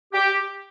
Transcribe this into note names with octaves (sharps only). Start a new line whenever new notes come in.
G4